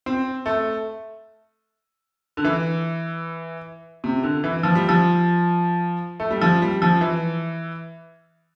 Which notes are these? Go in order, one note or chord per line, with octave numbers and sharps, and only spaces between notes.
C4
A3
D3
E3
C3
D3
E3
F3
G3
F3
A3
G3
F3
G3
F3
E3